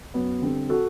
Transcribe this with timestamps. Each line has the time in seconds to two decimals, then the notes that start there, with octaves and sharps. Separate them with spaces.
0.14 F#2 B3
0.42 D3 G3 C4
0.69 F#4 A4